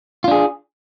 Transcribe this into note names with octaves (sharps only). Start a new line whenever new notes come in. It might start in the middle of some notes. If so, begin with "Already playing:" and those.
D4 F4 G#4